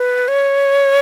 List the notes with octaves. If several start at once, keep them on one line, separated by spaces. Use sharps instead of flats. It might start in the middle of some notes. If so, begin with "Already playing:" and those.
Already playing: B4
C#5